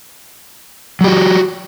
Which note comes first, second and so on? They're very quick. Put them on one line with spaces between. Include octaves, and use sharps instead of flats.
F#3 G4 F#4